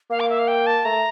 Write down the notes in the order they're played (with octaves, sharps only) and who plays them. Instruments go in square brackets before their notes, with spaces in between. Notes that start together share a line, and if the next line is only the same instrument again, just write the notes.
[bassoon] A#3 [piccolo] F5
[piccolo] D6
E5
F5
G5
A5
[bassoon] A3 [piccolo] A#5